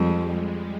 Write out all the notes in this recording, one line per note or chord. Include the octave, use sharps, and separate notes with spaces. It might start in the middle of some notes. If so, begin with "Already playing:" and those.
Already playing: F2 G3 G#3
G#3